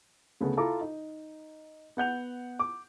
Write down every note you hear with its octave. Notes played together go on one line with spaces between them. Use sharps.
D2 C#3 A3 B3
E4 F4 A4 A#5 D6
D#4 D#5
B3 F#5 G6 F7
D6